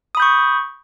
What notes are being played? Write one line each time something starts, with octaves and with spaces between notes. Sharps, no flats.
B5 C#6 D#6 G6